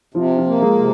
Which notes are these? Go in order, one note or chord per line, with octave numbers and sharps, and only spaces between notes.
C3 F3 F4
F3 F4
A#3
G#3 G#4
C3